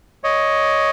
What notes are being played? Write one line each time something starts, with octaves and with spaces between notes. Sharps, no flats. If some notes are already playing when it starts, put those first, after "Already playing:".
C#5 D#5